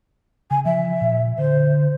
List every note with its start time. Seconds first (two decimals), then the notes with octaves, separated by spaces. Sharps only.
0.51 C#3 G#5
0.65 F3 E5
1.01 A#2
1.38 D3 C5